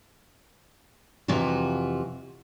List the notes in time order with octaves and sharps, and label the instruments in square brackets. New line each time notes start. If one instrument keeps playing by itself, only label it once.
[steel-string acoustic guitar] F2 C3 E3 F4 F#4